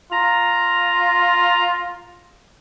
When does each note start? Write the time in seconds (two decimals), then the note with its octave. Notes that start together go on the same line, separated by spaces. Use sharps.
0.12 F4 A#5